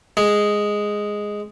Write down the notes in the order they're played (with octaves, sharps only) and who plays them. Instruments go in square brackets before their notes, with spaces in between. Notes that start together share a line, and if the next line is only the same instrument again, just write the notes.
[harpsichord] G#3